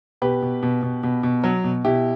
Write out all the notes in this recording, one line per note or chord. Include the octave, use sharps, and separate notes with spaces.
B2 G4 B4
B2
B2
B2
B2
B2
F#3
B2
B2 E4 G4